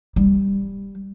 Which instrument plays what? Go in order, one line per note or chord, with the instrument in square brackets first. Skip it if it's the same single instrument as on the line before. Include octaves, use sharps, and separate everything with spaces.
[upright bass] G3